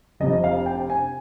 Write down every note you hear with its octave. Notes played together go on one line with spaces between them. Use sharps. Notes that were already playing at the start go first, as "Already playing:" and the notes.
F1 F2 C3 D#5
F5
G5
G#5